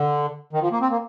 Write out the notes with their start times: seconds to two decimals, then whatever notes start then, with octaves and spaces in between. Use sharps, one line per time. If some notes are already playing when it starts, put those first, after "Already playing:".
Already playing: D3
0.53 D#3
0.62 F3
0.72 A#3
0.81 C4
0.91 A#3